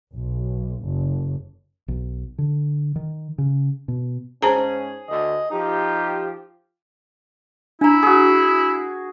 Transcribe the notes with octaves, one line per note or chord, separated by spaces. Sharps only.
B1
F#1
B1
D3
D#3
C#3
B2
G#2 C#4 G#4 C5 A5 A#5
D2 D3 D#5
F3 D#4 G4
D4 E4 A#5
F#4 G#4